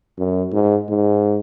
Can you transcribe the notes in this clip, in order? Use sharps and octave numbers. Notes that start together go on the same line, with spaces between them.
F#2
G#2
G#2